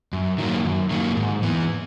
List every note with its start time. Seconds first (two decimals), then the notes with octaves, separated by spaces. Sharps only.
0.13 F#2
0.38 D#3 F#3 A#3
0.65 F#2
0.91 D#3 F#3 A#3
1.17 G#2
1.42 E3 B3